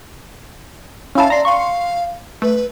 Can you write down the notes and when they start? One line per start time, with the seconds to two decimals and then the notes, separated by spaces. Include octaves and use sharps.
1.15 C#4 E4 F5 A5
1.30 D5 A#5 C6
1.45 F5 C6 C#6
2.42 A3 B4